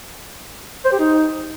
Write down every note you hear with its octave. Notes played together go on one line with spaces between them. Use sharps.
C5
G4
D#4